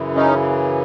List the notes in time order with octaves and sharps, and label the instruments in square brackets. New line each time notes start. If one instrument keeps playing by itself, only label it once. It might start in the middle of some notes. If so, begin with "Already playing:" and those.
Already playing: [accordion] F#2 C#3 E3
C#4 D#4